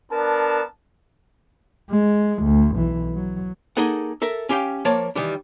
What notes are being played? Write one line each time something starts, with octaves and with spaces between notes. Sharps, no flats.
B3 D4 A#4 A5
G#3
D2
B1 E3
F#3
A#3 D#4 G#4 A4 F#5
A4 A#4 E5
C#4 G4 F5 G5
F3 A#3 C#5 D5 A5
D#3 E3 G3 D4